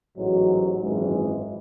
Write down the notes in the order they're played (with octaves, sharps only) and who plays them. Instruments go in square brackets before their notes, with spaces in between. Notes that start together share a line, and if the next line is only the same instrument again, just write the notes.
[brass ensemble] A1 G#2 F#3
G#1 F#2 E3 G#3